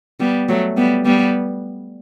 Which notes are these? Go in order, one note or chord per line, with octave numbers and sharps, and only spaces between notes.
G3 B3
F#3 A3
G3 B3
G3 B3